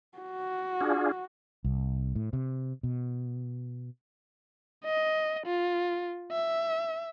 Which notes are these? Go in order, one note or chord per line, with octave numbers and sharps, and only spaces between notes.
F#4
D4 F4 G#4
C2
A2
C3
B2
D#5
F4
E5